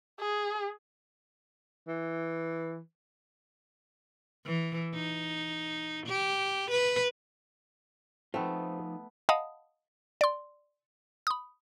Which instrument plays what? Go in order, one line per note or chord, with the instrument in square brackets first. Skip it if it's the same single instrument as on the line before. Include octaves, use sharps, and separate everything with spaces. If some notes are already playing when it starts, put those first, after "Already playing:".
[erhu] G#4
[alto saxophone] E3
[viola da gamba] E3
D#4
G4
B4
[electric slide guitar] F3 D#4 F4 [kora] A3 B3 [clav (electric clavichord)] C4
[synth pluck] D#5 F5 F#5 A5 B5 D#6
D5 C6
B5 D#6